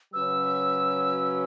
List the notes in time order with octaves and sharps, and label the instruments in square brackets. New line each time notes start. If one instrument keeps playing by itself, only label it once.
[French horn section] C#3 F#3 C#4 F#4 B4 [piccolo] E6